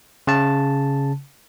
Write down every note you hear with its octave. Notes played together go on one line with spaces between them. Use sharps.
C#3 A5